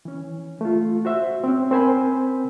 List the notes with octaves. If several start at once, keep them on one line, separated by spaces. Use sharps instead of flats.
E3 C#4
A3 F4
F#4 C5 E5
C4 C#4
C4 A#4 C5 G#5 B5